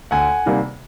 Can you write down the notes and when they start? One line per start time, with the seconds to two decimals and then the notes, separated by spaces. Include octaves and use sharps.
0.11 D2 F#5 G#5
0.46 C3 D#3 G3 A#3